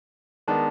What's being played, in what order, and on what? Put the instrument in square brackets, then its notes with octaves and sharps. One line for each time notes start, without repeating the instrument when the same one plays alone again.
[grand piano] D#3 G#3 B3 D4 [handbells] A5